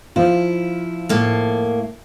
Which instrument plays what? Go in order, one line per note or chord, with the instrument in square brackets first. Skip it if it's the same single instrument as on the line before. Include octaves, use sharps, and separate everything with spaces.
[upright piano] F3 F4 [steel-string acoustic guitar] E4
[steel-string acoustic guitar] A2 A#3